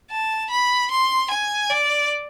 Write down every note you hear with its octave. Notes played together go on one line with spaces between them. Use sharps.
A5
B5
C6
G#5
D5